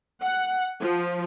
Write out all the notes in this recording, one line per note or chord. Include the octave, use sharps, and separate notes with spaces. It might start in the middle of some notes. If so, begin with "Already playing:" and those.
F#5
F3